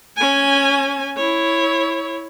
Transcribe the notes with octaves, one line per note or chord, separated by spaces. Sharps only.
C#4 G#5
E4 C#5